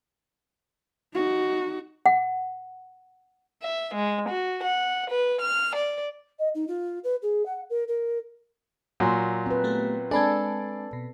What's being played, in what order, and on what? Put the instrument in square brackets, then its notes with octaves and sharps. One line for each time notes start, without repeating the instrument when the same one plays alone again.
[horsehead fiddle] D#4 F#4
[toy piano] F#5
[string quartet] E5
G#3
F#4
F#5
B4
F6
D5
[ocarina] D#5
D#4
F4
B4
G#4
F#5
A#4
A#4
[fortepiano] A#2 F#3 [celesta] G#5 C6
[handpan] C4 B4
[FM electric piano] A3 B3 G4
[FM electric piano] G#3 C4 D4 [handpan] A4 [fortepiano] D5 [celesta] G#5 B5 G#6
[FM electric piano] B2